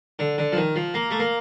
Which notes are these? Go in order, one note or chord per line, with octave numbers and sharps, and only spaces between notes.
D3
D3
F3
D#3
F3
A#3
A3
A#3